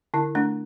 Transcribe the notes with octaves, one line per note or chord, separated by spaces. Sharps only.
D3 E4
A3 D4